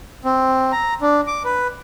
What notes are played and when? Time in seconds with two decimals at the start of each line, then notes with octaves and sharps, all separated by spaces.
0.25 C4
0.72 A#5
1.01 D4
1.27 D6
1.45 B4